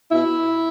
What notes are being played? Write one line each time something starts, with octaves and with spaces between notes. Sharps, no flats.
B2 E4